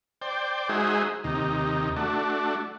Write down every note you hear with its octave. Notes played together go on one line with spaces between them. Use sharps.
C5 D5 G5
G#3 D#4 F#4 G#4 C5 E5
D#2 C3 D#4
A3 D4 F#4